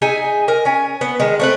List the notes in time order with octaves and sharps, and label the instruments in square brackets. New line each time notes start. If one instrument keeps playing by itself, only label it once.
[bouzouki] D#4 G#4 E5 G#5
A#4
C#4 G#5
B3
D#3 G#3
A3 C4 B4